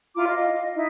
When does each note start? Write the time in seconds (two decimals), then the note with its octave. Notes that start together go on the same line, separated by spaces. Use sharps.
0.16 E4 F4 A#5 D6
0.28 D#5 F5
0.74 D#4 E4